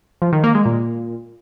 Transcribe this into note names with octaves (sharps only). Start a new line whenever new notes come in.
F3
D#3
A#3
G#3
A#2